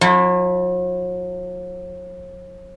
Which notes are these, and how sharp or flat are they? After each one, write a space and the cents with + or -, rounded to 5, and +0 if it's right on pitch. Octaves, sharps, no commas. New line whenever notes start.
F#3 -45 E4 +0